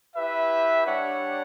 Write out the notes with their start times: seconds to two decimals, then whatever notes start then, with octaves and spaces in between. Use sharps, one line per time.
0.16 E4 G4 B4 E5
0.86 G3 D4 G4 C#5 F#5